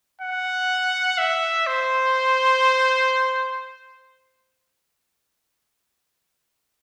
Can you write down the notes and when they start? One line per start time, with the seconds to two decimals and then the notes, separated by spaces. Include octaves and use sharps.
0.22 F#5
1.18 E5
1.67 C5